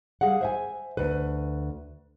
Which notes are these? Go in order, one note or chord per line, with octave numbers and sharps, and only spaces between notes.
G3 G#4 F5 F#5
C5 E5 G#5
D2 B4